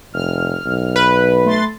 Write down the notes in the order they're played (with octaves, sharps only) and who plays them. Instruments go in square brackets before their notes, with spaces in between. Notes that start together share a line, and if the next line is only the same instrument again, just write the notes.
[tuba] F1 [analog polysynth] F6
[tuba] B1
[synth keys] B4
[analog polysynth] A3 C6 A6